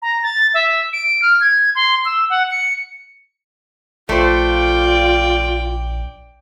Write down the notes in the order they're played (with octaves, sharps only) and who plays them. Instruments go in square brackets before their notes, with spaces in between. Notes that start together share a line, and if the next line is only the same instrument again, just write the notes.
[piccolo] A#5
A6
E5
D7
F6
G#6
C6
E6
F#5
C#7
[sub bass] A#1 [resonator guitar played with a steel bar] A3 C5 [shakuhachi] F4 [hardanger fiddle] D5 G5